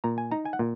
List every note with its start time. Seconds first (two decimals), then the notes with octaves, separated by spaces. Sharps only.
0.04 A#2 A#5
0.18 G#5
0.31 D#4 A#5
0.45 G#5
0.53 F#5
0.59 A#2